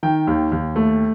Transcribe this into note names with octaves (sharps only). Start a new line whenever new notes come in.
D#3 G5
D#2
D#2
A3